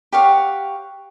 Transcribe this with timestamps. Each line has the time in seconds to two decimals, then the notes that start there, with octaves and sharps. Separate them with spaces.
0.12 G4 C#5 F5 F#5